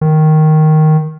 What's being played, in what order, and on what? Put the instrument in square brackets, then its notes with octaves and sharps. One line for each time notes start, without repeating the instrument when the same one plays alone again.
[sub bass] D#3